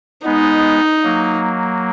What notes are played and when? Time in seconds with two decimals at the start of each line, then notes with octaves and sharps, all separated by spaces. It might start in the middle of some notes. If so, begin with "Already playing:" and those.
0.25 G#3 B3 D#4
1.04 F#3 A#3